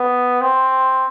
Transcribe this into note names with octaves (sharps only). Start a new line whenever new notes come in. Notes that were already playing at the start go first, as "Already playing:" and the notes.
Already playing: B3
C4